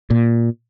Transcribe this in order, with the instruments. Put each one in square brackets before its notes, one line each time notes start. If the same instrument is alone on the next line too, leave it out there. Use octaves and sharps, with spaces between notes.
[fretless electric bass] A#2